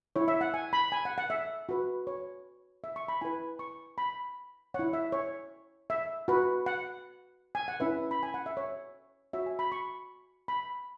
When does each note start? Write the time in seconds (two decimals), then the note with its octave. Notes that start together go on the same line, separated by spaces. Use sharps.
0.16 E4 C#5
0.28 E5
0.41 F#5
0.54 G#5
0.73 B5
0.92 G#5
1.05 F#5
1.18 F#5
1.30 E5
1.69 F#4 B4
2.07 C#5
2.84 E5
2.96 C#6
3.08 B5
3.21 E4 B4 G#5
3.59 C#6
3.98 B5
4.74 E4 C#5 F#5
4.93 E5
5.12 C#5
5.90 E5
6.28 F#4 B4
6.66 F#5
7.55 G#5
7.68 F#5
7.80 C#4 E4 B4 E5
8.11 B5
8.23 G#5
8.34 F#5
8.46 E5
8.57 C#5
9.33 F#4 C#5 E5
9.46 G#5
9.59 B5
9.72 C#6
10.48 B5